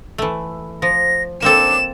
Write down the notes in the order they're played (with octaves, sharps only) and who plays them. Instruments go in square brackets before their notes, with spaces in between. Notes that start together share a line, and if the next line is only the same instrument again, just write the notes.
[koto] E3 A3
[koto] F3 [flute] A#6
[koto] A#3 C4 A4 [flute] D4 [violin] E7